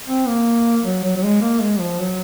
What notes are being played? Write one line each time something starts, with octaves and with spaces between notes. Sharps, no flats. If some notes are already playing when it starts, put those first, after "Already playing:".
C4
A#3
F#3
F#3
F#3
G#3
A#3
G#3
F3
F#3